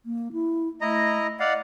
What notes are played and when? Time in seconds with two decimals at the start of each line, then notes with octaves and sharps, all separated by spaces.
0.06 A#3
0.33 E4
0.81 A3 E4 D#5 A#5
1.40 D5 D#5 F5 F#5